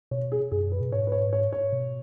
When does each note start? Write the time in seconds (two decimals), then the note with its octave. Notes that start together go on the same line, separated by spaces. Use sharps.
0.11 B2 C#5
0.32 G#4
0.52 F#2 G#4
0.72 B4
0.81 B2
0.92 G#2 C#5
1.07 B4
1.12 C#5
1.33 C#5
1.53 C#5
1.73 B2